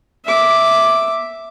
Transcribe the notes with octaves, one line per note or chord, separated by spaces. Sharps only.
E5 D6